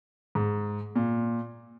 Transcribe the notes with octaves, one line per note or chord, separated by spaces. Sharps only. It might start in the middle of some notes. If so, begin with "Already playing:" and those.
G#2
A#2